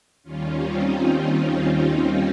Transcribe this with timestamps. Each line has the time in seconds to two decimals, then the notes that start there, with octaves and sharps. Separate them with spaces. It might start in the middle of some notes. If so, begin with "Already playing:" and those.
0.23 D#2 D#3 G3 C#4 F4
0.57 C4 D#4
0.91 C4
1.58 C4